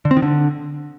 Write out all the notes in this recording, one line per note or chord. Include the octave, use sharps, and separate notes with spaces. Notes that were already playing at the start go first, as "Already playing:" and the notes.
D3
C4
D#3
D3